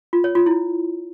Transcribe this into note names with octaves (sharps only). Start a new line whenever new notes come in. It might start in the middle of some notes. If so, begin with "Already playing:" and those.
F4
C#5
F4
E4